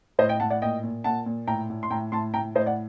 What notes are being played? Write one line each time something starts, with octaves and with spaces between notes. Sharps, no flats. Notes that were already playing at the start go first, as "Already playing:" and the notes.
A2 C5 D#5
D#5 G5
A2 F#5 A5
D5 F#5
A#2 D#5 G5
A#2
A#2 F#5 A5
A#2
A2 G5 A#5
A2
C6
A2 G5 A#5
A2 A5 C6
A2 G5 A#5
A2 C5 D#5
D5 F#5